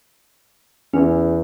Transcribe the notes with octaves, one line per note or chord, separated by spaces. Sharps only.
E2 C#4